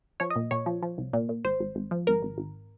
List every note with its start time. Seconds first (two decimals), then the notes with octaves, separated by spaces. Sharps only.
0.20 F3 C#5
0.30 D#5
0.36 A#2
0.51 A#2 C#5
0.66 F3
0.83 F3
0.98 C2
1.13 A#2
1.29 A#2
1.44 G#1 C5
1.60 G#1
1.75 G#1
1.91 F3
2.07 G#1 A#4
2.23 G#1
2.38 G#1